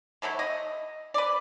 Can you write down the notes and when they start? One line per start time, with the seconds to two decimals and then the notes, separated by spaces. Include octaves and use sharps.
0.22 D#3 F#3 A3 E4
0.39 D#5
1.14 B4 D5